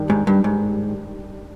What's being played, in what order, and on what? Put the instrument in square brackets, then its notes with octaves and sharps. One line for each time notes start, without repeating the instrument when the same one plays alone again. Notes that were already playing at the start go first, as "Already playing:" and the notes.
Already playing: [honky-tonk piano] G2 D#3
[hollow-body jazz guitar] G#2
G2
G#2